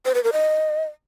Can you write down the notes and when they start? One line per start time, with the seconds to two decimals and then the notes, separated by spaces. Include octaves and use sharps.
0.05 C5
0.14 B4
0.24 A#4
0.33 D#5